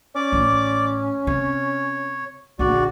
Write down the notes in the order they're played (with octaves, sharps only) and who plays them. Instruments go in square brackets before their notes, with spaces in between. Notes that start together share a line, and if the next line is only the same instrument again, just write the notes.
[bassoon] C#4 [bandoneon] D5 D6
[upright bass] A1 F4
[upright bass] C3 [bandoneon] C#5
[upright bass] A#1 D3 [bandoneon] F#4 D5